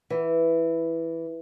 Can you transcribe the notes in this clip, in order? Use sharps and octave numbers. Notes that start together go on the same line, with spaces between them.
E3